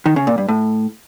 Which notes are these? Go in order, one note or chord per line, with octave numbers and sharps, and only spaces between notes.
D#3
C#3
A#2
G2
A2